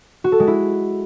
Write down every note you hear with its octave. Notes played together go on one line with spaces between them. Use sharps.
F#4
A4
G#3
E4